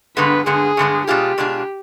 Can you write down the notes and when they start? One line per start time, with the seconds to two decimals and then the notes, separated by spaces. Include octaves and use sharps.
0.17 G2 D3 G#3 B3 B4
0.46 G2 D3 G#3 B3 G#4
0.77 G2 D3 G#3 B3
1.07 B2 G#3 D4 F4 G4 G#4
1.38 B2 G#3 D4 F4 G#4